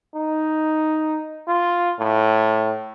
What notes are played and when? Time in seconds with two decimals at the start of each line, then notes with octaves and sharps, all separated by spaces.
0.15 D#4
1.48 F4
1.99 A2